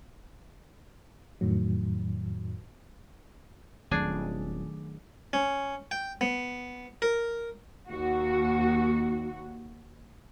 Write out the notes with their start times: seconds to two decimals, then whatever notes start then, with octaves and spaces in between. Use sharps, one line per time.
1.41 F2 A2 D#3 F#3
3.91 D#1 D#3 F#3 A3 C4 D4 G#4
5.33 C#4
5.91 G5
6.21 B3
7.02 A#4
7.89 D#2 F#4